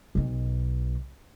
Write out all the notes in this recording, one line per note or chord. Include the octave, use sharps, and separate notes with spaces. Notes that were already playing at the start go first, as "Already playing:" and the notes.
B1 B2